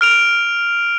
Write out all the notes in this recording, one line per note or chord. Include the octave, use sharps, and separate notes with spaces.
F6 D7 F7